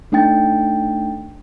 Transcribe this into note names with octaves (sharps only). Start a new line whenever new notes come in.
A3 D4 D#4 G5 A6